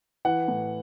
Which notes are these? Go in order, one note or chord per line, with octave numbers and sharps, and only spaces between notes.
E3 F#5
A2